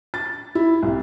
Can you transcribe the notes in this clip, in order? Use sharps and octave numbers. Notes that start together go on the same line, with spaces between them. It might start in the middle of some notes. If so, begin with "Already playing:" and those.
A6
E4
C2